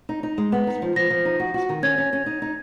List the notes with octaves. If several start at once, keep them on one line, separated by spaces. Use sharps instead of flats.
D#4
D#4
G#3
B3
D#4
F3
F3 A#6
F3
D#4
F#4
F#4
D#3
C#4 G#6
C#4
C#4
D#4
D#4